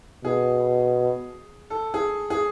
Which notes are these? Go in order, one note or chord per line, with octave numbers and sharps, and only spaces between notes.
B2 G#4
A4
G#4
G#4